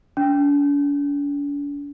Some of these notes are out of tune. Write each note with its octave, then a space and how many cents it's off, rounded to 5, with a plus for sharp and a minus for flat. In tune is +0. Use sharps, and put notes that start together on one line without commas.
D4 -45